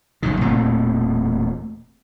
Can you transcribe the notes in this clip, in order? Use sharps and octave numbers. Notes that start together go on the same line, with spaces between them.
F#1 F#2 B2 D#3
E1 A#2 A3 C4